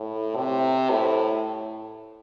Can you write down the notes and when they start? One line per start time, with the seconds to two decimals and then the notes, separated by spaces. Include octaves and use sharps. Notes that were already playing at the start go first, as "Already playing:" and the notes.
Already playing: A2
0.36 C3
0.90 A2